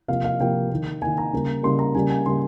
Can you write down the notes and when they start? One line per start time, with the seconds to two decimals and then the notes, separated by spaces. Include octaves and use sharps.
0.08 C3 F3 A#3 F5
0.24 F5
0.40 C3 F3 A#3 G5
0.71 D#3 A#3
1.01 D#3 A#3 G#5
1.18 A#5
1.33 C#3 G3 A#3
1.63 C#3 G3 A#3 C6
1.79 A#5
1.95 C#3 G3 A#3 G#5
2.10 G#5
2.26 C#3 G3 A#3 C6